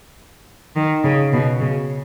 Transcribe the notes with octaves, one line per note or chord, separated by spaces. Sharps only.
D#3
C#3
B2
C#3